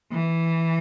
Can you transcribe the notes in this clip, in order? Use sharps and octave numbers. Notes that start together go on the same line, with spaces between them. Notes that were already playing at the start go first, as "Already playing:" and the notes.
E3